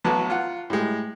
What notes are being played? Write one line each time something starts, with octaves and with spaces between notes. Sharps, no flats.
A1 F#3 B3 F#4 A5
F4 F#5
A2 G3 G#3